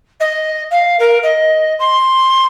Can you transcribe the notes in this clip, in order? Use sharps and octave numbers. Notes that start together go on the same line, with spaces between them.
D#5
F5
A#4
D#5
C6